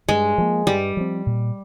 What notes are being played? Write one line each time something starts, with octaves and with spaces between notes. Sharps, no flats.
G2 G#3
F3 A#3
G2 G3
F3 C4
A#2